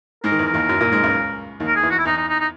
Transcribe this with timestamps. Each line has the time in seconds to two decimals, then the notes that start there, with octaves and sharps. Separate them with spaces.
0.24 G#2 G#3 A#4
0.32 D#3
0.39 E2 E3
0.46 A#4
0.54 D#2 D#3
0.69 F#2 F#3
0.81 A#2 A#3
0.92 G#2 G#3
1.04 C#2 C#3
1.60 D#2 D#3
1.67 A#4
1.75 G#4
1.83 E2 E3
1.90 F#4
1.99 E4
2.05 E2 E3 D#4
2.17 D#4
2.29 D#4
2.40 D#4